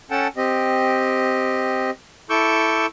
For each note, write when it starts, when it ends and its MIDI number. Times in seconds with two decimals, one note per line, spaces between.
0.11 0.27 61
0.11 0.27 69
0.11 0.27 78
0.11 0.27 79
0.11 0.27 81
0.37 1.90 60
0.37 1.90 67
0.37 1.90 75
2.30 2.86 64
2.30 2.86 69
2.30 2.86 85
2.30 2.86 86
2.30 2.86 88
2.30 2.86 91